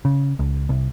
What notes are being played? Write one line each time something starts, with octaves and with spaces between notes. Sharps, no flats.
C#3
C#2
C2